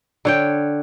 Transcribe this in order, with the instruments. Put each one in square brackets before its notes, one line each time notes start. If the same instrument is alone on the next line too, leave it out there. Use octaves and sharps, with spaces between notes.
[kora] D3 C#5 G5